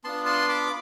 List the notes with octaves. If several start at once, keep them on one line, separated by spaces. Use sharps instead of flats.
B3 D4 F4 A5 C6
A5 C6
B5 D6